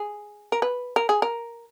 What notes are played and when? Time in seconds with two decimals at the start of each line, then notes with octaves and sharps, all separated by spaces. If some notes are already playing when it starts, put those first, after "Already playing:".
Already playing: G#4
0.52 A#4
0.62 B4
0.96 A#4
1.09 G#4
1.22 A#4